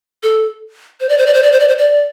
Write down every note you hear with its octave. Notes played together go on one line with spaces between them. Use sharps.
A4
C5
D5
C5
D5
C5
D5
C5
D5
C5
D5